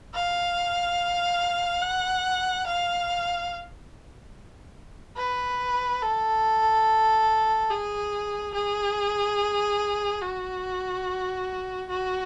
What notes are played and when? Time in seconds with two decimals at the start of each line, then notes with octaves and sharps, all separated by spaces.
0.15 F5
1.82 F#5
2.66 F5
5.18 B4
6.02 A4
7.71 G#4
8.55 G#4
10.22 F#4
11.90 F#4